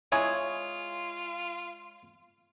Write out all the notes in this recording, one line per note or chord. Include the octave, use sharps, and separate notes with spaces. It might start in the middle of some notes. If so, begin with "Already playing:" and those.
G#3 E4 F4 G#4 C#5